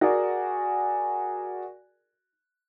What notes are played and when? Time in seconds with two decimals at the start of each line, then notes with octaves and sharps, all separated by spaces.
0.01 F#4 G#4 A#4 D5